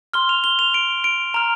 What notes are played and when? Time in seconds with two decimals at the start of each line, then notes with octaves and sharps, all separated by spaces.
0.13 C6 F6 G7
0.29 F7
0.44 G7
0.59 F7
0.74 D7
1.04 D7
1.34 A#5 F6 F7